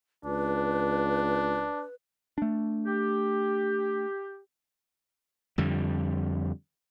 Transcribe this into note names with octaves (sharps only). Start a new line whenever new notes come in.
C#2 D4 B4
A3 D4
G4
F2 D3 G3